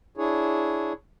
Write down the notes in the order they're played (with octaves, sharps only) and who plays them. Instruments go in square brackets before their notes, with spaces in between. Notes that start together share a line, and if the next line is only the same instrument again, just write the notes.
[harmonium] D4 E4 G#4 C#5